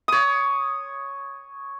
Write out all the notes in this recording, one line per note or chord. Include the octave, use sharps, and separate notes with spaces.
C#5 D#6